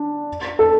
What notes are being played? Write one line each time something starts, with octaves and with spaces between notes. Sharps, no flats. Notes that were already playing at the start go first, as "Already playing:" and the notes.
Already playing: D4
A4